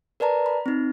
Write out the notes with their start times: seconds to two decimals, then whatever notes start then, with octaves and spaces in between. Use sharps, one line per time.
0.20 A#4 B4 D5 A5 A#5
0.46 B5
0.66 C4 D#4